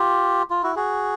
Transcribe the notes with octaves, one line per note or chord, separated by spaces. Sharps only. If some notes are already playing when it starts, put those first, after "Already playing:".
Already playing: F4 G4
F4
E4 F#4
F#4 G#4